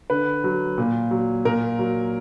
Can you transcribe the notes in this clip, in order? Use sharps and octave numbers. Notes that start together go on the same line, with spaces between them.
D3 B4
F#3
A#2
F#3
A#2 A#4
F#3